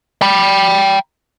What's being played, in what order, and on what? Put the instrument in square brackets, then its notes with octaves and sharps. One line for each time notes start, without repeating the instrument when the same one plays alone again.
[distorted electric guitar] G5 B5